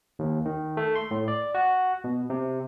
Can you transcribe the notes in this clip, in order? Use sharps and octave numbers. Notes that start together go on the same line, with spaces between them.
D#2
D#3
A3
C6
A2
D5
F#4
B2
C3